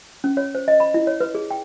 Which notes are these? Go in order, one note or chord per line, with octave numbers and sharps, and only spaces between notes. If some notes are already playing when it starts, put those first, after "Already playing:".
C#4
C#5
C5
D#5
B5
E4
C#5
B4
G#4
G5